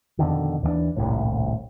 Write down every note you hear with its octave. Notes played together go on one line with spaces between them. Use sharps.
F2 B2 D3 D#3
D#2 E3 A#3 D4
D#1 C2 A2